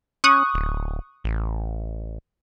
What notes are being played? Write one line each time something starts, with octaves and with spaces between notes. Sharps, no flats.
C#4 C#6 D#6 F#6
D1
A1